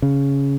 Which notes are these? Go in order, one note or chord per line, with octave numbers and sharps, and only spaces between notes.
C#3